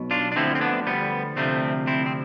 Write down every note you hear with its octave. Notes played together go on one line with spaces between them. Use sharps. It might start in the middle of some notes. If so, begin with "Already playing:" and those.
Already playing: B1 B2
D4 F4
D4
D2 D3 F3 C4 E4
C4
B3 D4
G3 B3
D2 C3 F3 A3 C4
C4 E4
C4